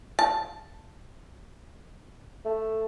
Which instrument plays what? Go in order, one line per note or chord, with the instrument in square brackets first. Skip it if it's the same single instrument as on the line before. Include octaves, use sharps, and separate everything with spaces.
[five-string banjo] A5
[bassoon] A3